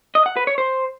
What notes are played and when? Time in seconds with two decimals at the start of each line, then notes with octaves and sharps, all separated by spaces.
0.15 D#5
0.26 F#5
0.37 B4
0.47 C#5
0.58 C5